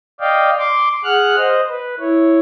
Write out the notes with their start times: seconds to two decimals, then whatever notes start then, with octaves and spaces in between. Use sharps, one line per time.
0.20 D5 D#5 F5 G5
0.59 C6 D6
1.04 G#4 F#5 F6 F#6
1.37 C5 D#5
1.70 B4
2.00 E4 C#5